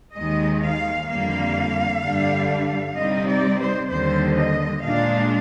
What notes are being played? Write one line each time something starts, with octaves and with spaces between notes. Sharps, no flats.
D#2 D#3 G#3 D#5
F5
F2 D3 G3 A#3 F5
G2 D3 G3 D4
C3 G3 C4 D#4 D#5
D5
C5
D#2 D3 G3 C5
D#5
A#2 G#3 D4 F5